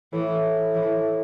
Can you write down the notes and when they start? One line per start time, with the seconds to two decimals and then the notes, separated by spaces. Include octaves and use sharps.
0.13 A2 E3
0.74 E3